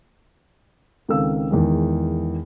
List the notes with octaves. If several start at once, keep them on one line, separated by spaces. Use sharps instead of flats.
C#2 D#3 C4 A4 F5 E6
E2 D#3 G#3